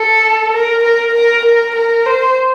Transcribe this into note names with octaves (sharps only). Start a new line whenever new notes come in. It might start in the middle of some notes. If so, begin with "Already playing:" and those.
Already playing: A4
A#4
A#4
A#4
A#4
A#4
C5